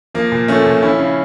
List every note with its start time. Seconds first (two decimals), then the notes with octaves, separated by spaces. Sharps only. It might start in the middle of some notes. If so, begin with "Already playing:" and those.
0.14 F3 A#3
0.32 A#2
0.48 F3 A3 C#4
0.66 A#2
0.82 F3 C#4 E4
0.99 C#3